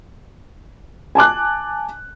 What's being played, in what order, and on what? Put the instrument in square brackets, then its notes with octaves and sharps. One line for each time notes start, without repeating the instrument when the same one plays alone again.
[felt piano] G#5 A5 D6 F#6